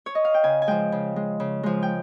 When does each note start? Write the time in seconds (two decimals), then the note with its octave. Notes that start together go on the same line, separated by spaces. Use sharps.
0.06 C#5
0.15 D#5
0.25 F5
0.34 G5
0.44 C#3 G#5
0.62 G#5
0.67 F3 G#3 G5
0.92 C#3
1.16 G#3
1.40 C#3
1.63 F3 G#3
1.83 G5